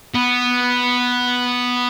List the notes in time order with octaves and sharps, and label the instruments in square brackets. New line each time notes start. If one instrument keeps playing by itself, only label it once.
[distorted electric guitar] B3